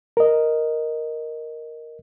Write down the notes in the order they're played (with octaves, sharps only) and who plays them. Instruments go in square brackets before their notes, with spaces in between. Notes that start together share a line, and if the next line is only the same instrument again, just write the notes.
[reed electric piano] A#4 D#5